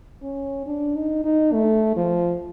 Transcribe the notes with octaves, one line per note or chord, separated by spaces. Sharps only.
C#4
D4
D#4
D#4
A3
F3